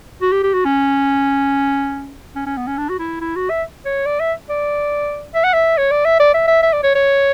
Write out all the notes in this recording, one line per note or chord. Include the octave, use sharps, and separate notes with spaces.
F#4
G4
G4
F#4
C#4
C#4
C#4
B3
C#4
D4
F#4
E4
E4
F#4
E5
C#5
D5
E5
D5
E5
F#5
E5
C#5
D5
E5
D5
E5
E5
E5
D5
C#5
C#5